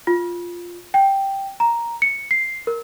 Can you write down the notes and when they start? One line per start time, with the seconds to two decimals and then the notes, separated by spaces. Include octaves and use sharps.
0.07 F4
0.94 G5
1.60 A#5
2.02 C#7
2.31 C7
2.67 A#4